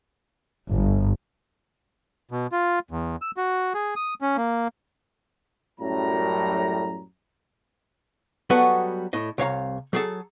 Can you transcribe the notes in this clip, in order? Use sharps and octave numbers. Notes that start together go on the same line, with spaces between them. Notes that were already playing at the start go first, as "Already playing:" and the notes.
G1
B2
F4
E2
E6
F#4
G#4
D#6
C#4
A#3
F#2 A2 G3 A#5
F#3 G3 B3 F#4 A4 B4
A2 D#5
C2 C#5 F5 A#5
F#3 G#4 A4